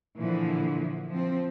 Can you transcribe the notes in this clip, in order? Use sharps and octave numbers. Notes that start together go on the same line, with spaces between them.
A#2 D3 E3 F3
F3 C4